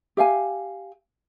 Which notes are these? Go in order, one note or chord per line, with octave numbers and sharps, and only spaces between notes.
G4 E5 F5 G#5